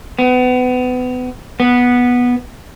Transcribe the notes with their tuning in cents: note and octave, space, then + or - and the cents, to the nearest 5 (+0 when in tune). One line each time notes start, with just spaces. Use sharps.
B3 +30
B3 -10